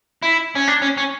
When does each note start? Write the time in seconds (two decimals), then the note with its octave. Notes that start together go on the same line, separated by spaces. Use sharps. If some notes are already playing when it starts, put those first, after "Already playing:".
0.23 E4
0.55 C#4
0.68 D4
0.82 C#4
0.97 C#4